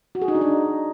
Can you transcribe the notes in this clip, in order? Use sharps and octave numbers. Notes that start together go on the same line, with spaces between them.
F#4
G#4
D#4
D4
D#4